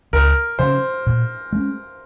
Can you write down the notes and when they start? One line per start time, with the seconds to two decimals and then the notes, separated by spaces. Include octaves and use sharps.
0.13 C#2 A#4
0.59 C#3 F#3 C#4 C5
1.07 A#2
1.53 G#3 C#4